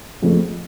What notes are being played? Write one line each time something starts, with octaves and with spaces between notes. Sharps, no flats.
F2 C#3 F3 A3